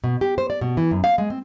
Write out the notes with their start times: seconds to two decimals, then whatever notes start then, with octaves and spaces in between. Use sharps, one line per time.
0.04 B2
0.21 G4
0.38 C5
0.50 D5
0.61 B2
0.77 E3
0.91 F#2
1.04 F5
1.18 G#3
1.30 C4